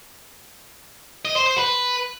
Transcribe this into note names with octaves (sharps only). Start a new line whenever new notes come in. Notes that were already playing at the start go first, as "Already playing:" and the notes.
D#5
C5
C5
B4